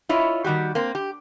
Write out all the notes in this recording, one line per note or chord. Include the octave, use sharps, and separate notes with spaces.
E4 F4 C#5 D#5
D#3 G3 F#4 G4
A#3 C4
G4